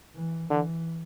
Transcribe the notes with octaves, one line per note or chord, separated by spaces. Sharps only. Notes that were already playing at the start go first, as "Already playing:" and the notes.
E3
D3 E3